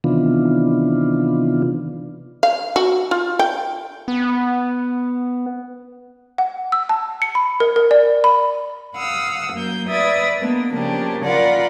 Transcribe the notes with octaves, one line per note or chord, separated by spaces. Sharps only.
C3 D#3 E3 B3 D4 F4
F5
F#4
F4
G5
B3
F#5
E6
A5
C#7
B5
A#4
A#4
D5
B5
F5 F#5 D#6 E6
F#2 A#3 G6
B4 D5 E5 D#6 G#6 A6
G#3 A#3 B3 D4
C#3 F3 A#3 D4 G4
F4 A#4 D5 F5 F#5 B5